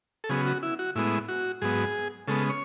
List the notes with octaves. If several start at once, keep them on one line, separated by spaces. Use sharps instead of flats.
A4
C#3 F#3 B3 G#4
F#4
E4
F#4
A2 G#3 B3 E4
F#4
G#2 F#3 B3 G#4
C#3 G#3 B3 A4
C#5